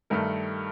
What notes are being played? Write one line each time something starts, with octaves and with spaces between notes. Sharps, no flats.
G2 D#3 A3 A#4